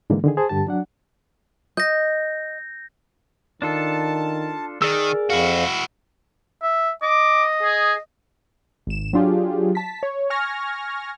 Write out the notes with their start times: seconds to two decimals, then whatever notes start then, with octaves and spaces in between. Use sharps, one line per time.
0.10 G#2 D3 E3 G#3 A#3
0.24 D3 D#3 G#4
0.37 G#4 C5 A5
0.49 G2 D3 G4 A5
0.67 F#3 D4 F#5
1.77 D#5 G6 A#6
3.62 D#3 D4 F4 A4 A5
4.82 D#3 G#4 A#4 D5 E6
5.30 F2 E4 F#4 F5
6.62 E5
7.02 D#5 D6
7.63 G#4
8.87 G#1 E7
9.13 F#3 D4 F4 G4 G#4
9.75 A5 B6
10.03 C#5
10.30 G#5 C#6 F6 G#6 A#6